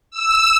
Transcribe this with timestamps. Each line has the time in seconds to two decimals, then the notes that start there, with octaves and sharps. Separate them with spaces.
0.11 E6